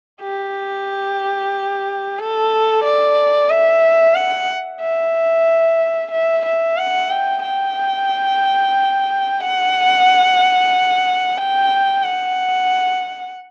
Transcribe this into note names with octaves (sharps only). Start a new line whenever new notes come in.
G4
A4
D5
E5
F#5
E5
E5
E5
F#5
G5
G5
F#5
G5
F#5